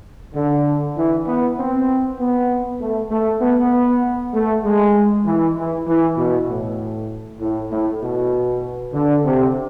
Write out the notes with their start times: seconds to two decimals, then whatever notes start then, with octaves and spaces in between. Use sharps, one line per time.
0.35 D3
0.96 E3
1.26 B3
1.57 C4
2.19 B3
2.80 A3
3.10 A3
3.41 B3
4.34 A3
4.64 G#3
5.25 E3
5.56 E3
5.87 E3
6.17 B2
6.48 A2
7.40 A2
7.70 A2
8.02 B2
8.93 D3
9.25 C3